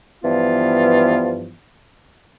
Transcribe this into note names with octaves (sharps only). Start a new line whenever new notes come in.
G2 E3 F3 B3 F4